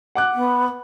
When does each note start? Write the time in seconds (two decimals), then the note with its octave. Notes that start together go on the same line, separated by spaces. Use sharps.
0.15 F#5 D6 F#6
0.35 B3